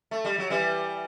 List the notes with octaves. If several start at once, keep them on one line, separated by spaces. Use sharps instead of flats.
A3
G3
F#3
E3 G3